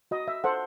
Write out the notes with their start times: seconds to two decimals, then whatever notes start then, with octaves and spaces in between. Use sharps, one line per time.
0.11 F#4 D#5
0.28 E5
0.44 A4 C5 F#5